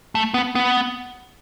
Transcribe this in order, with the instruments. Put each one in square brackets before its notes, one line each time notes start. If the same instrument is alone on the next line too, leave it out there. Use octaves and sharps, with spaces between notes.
[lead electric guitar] A3
B3
B3